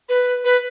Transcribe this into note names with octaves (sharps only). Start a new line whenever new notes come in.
B4
B4